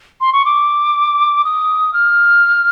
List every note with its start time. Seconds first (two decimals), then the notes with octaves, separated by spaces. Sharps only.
0.21 C6
0.33 C#6
0.45 D6
1.44 D#6
1.93 F6